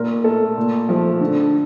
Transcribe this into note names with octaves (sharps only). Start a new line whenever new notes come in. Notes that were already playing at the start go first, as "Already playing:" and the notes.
Already playing: A#2 A#4
A3 A4
A#2
F3 A3
D3